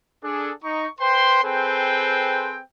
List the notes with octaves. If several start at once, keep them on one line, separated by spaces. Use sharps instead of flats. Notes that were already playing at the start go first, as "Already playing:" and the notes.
D4 G#4 A4
D#4 C#6
B4 C5 G5 C6
C4 G#4 A4 B4 C5 G5